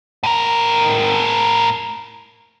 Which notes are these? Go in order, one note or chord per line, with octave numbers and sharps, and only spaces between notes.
A2 A#4